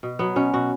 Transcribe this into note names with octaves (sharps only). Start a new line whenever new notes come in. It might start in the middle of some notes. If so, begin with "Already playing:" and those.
B2
F#3 B3
B2 C#4
B2 F#4